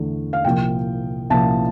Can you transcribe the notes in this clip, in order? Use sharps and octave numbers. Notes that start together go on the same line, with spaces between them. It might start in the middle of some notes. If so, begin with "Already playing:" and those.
Already playing: E2 D3 A3
F5
C2 A#2 F3 G5
C2 A#2 F3 A5